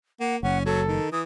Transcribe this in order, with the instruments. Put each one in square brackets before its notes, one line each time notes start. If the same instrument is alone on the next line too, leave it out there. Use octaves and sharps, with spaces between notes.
[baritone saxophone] A#3 [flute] F#5
[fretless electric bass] F#1 [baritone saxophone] C#4 [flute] F#5
[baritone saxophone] F#3 [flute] A4
[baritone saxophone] D#3
[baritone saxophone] E3 [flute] D#6